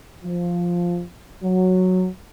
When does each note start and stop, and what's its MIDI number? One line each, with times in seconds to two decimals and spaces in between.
0.24 1.03 53
1.43 2.06 54